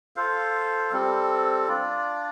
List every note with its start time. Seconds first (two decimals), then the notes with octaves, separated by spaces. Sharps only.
0.16 F4 A4 C5 F5
0.92 G3 C4 A4
1.68 D4 F4 D5